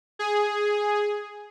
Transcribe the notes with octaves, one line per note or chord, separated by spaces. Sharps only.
G#4